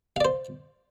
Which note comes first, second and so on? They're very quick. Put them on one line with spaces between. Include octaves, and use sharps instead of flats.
F5 D5 C5